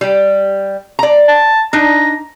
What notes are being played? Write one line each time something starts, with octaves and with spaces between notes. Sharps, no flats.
G3 G4
D5 A#5
A5
D4 D#4 A#5